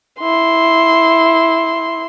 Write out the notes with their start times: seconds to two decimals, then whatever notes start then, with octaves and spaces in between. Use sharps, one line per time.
0.20 E4 C6